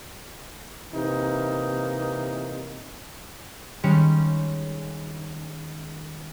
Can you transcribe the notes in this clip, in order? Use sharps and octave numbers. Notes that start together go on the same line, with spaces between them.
C3 E3 A#3 D#4
D#3 G3 G#3 C#4 C#7